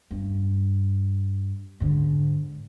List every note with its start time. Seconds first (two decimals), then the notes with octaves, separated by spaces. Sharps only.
0.11 G2
1.80 G#2 D3